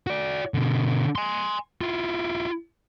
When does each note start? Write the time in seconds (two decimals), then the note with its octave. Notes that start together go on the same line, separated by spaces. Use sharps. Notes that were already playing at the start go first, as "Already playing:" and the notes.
0.07 F#4 D5
0.54 B2 D3
1.16 G#5 C6
1.81 E4 F4